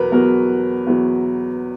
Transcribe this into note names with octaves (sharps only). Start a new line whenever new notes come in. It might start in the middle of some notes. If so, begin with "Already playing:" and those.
Already playing: E2 B2 F#3 A#4 B4
E2 B2 F#3 A#4
E2 B2 F#3